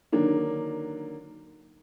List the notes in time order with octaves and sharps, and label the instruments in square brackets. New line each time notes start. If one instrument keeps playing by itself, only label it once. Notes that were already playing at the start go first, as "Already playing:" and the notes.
[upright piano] D3 D#3 F#3 A#3 D4